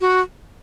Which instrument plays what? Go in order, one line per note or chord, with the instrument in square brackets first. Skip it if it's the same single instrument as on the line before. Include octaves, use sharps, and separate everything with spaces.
[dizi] F#4